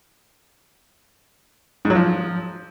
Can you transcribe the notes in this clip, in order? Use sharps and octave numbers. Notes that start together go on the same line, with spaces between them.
G#2
F#3
F3